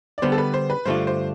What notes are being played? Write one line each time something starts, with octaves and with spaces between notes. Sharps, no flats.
D5
D3 G3 B3 C5
A4
B4
C5
B4
G2 D3 A3 D4 F4 C5
C5